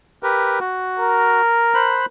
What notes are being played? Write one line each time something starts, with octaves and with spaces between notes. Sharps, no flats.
G4 A#4 B4
F#4
A#4
C5 B5 F#6